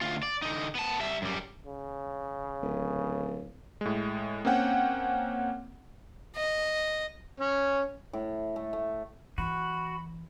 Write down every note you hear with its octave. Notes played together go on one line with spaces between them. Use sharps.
D2 F4
D5
D3 D#4
B3 A5
G3 E5
F#2 G3
C#3
D1
A2 G#3
A#3 C4 C#4 F#5 G5
D#5
C#4
A2
A3
A3
E3 F#4 B5